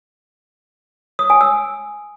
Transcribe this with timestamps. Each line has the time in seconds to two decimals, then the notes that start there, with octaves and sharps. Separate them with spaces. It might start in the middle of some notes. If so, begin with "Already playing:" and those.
1.19 D#6
1.30 G#5
1.41 E6